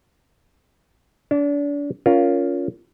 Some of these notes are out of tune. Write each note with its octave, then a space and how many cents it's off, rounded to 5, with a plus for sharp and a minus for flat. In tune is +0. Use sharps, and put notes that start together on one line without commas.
D4 -35 A5 +20
C#4 +20 F4 +0 A#4 +0